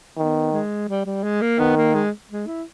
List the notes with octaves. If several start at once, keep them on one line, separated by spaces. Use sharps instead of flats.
D#3 B3
G#3
G3
G3
G#3
A#3
D#3 B3
A#3
G#3
G#3
E4